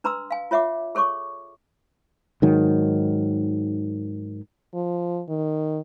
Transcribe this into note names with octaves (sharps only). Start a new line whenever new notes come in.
D4 B4 A#5 C6 D#6 E6
F5 G#5
F4 C#5 E5 F#5 D6
G#4 A4 C#5 C#6 D6
G#2 D#3 F#3
F3
D#3